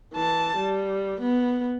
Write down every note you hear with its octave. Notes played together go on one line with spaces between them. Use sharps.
E3 A5
G3
B3